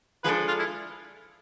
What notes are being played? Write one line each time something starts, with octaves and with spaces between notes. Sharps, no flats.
F3 G#3 D4 A4 B4
F4
E4